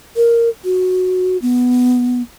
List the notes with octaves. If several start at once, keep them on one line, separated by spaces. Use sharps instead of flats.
A#4
F#4
B3